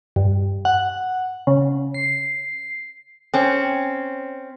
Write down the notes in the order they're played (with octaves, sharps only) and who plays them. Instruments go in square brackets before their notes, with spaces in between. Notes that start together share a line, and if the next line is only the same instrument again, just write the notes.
[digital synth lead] G2
F#5
C#3
C7
[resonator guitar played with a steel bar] C4 C#4